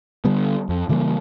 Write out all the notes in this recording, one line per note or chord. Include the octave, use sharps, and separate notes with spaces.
D3 G3 B3
F2
C#3 E3 G3 A#3